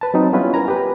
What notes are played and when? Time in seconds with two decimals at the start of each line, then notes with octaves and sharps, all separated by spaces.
0.01 B4 A5
0.14 F#3 C4 D#4
0.33 G3 B3 C#4 E4 F4 B4
0.54 A#4 G#5 A#5
0.68 G4 B4